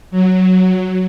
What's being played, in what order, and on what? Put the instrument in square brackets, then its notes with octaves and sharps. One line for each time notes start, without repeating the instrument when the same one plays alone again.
[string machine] F#3